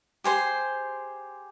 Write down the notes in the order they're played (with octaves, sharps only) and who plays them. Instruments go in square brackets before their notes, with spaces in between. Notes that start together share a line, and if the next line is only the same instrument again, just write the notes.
[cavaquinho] G4 G#4 C5 C6